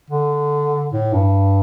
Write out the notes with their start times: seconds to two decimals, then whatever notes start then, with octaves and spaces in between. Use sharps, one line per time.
0.10 D3
0.93 A2
1.14 G2